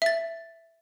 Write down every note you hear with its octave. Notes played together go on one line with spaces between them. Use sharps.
E5 A6